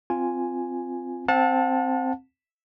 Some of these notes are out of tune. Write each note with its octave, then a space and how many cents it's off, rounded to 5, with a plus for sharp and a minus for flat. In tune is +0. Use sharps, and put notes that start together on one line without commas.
C4 -10 F4 +0 G#5 +0
C4 +0 F#5 -40 A5 +0